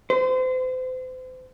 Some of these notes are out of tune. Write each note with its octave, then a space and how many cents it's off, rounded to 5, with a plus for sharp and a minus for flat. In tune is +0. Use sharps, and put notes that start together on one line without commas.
C5 -35